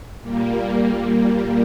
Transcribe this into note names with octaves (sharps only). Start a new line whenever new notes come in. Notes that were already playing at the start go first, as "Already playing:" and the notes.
A#2 G3 A#3